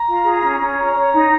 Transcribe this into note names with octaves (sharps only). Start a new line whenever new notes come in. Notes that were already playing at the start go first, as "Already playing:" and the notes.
Already playing: A#5
F4
G#4
C#4
C#4
C#5 A#5
C#5
D#4